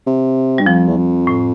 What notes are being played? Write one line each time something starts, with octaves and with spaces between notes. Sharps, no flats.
C3
G2 G3
F2 F3
E2
F2
A2